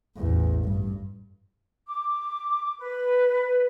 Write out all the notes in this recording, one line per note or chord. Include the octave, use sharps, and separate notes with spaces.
A1 E2
G2
D6
B4